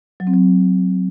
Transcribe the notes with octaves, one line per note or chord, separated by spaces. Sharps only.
F#3
C4
F#3